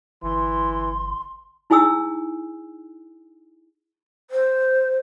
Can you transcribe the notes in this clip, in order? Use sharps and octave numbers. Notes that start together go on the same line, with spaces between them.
G1 E3 C6
D#4 E4 G#4 G#5 D#6 E6
C5